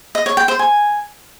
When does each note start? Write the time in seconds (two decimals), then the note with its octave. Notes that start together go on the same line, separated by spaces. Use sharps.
0.15 D#5
0.26 C#5
0.37 G5
0.48 C5
0.59 G#5